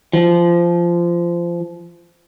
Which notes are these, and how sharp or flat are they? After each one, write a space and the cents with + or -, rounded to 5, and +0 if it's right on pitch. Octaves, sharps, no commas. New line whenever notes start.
F3 -20